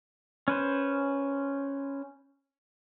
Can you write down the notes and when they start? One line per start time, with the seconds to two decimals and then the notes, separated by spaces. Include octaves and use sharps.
0.48 C#4 B4 C5